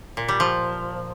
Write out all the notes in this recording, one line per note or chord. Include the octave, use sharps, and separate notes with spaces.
A#2
G3
F3